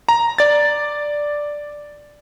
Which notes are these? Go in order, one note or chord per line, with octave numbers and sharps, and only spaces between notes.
A#5
D5 A6